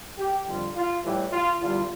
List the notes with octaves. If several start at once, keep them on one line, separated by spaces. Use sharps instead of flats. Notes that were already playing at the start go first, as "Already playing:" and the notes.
G4
F2 D3 G3 F4
F4
A2 E3 G3 G4
F4
E2 D3 G3 F4